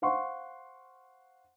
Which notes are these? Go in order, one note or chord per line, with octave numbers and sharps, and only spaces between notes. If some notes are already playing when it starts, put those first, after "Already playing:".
C5 F5 F#5 C6 C#6